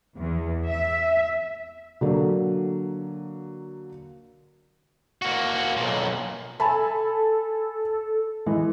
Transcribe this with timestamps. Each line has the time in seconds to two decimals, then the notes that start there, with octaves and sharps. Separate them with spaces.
0.17 E2
0.70 E5
2.01 D3 F#3 A#3
5.22 A#3 F#4
5.77 B1 A#2
6.60 A4 G#5 A5 B5
8.46 E3 G#3